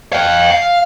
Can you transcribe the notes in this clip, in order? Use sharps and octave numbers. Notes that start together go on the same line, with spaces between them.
F5 G5
F5